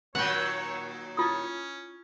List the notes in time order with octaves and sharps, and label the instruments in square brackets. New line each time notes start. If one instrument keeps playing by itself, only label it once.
[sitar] A#2 D#3 F#3 [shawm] C#5 [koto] F#5 G5
[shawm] C#4 [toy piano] E4 F4 D#6